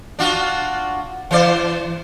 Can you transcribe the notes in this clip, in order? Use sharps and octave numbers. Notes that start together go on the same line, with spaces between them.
D4 F4 F#4
E3 C5 D5